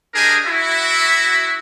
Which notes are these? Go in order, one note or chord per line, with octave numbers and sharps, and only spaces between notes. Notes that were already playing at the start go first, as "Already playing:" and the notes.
D4 G4 G#4 A#4 D#5 G#5
E4 F#4 E5